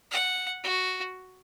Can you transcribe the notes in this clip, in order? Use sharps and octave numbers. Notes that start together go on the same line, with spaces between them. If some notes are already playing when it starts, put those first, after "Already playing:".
F#5
F#4